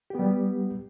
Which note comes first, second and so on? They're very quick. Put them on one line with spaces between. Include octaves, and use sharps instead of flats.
G4 B3 G3